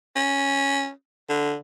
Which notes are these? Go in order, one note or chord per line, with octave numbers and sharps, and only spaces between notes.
C#4
D3